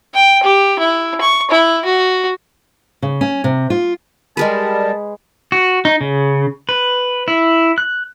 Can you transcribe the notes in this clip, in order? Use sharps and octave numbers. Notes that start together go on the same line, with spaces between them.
G5
G4
E4
C#6
E4
F#4
C#3
C#4
C3
F4
G3 G#3 G#4 A#4 B4 A5
F#4
D#4
C#3
B4
E4
F#6